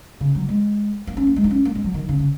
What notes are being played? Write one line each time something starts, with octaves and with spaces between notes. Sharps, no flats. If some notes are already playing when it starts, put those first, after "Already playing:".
C#3
F#3
G#3
A#3
C#4
A#3
G#3
D#4
C#4
A#3
G#3
F#3
D#3
C#3
C#3